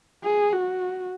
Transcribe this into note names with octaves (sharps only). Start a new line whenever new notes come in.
G#4
F#4